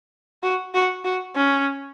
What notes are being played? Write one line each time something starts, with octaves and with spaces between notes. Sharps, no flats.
F#4
F#4
F#4
C#4